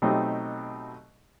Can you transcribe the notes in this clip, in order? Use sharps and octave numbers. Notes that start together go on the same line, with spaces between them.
B2 F#3 A3 C4 D#4 G4